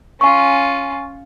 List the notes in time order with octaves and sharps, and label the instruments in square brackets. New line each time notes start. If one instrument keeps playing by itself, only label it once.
[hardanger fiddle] C#4 F4 [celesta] G#5 C#6